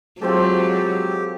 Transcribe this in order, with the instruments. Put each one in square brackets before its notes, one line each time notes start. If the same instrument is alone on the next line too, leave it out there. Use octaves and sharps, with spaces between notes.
[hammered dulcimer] F3 C4 A4 [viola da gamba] F#3 [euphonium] G#3 [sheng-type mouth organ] G4